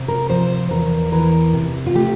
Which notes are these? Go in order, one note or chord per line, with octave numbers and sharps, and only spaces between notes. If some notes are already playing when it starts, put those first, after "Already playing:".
Already playing: C3
A#4
F3 C5
E2 A#4
E3 A#4
C3
F4
A3 G4